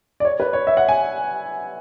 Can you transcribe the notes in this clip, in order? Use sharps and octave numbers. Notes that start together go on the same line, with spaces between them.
D5
C#5
B4
C#5
E5
F#5
G#5